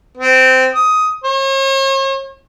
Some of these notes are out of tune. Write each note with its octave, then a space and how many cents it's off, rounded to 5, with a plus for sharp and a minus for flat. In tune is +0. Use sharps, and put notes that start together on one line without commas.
C4 -15
D#6 +10
C#5 -45